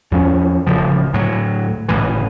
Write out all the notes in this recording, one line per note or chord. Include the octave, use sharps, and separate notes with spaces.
E2 F3 C#4
D1 C#3 F3
D2 A2 F#3
F#1 D2 A2 E3